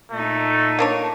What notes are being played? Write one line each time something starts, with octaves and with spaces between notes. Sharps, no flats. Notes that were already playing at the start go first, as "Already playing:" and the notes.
A#2 A3 D#4
A#3 D4 C#5